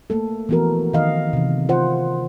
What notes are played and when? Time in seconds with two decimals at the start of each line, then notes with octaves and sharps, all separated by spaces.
0.10 A3 A#3 A4
0.49 E3 F3 B3 F#4 A#4
0.94 D#3 D#5 F5
1.33 C3 E3
1.69 F4 C5 F#5